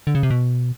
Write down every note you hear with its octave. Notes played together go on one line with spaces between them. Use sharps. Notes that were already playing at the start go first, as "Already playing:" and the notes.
D3
C#3
C3
B2